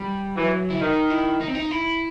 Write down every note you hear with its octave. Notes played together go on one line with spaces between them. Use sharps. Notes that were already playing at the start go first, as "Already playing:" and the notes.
Already playing: G3
E3 F#3
E4
D#3 D#4
E4
D#4
C4
D#4
E4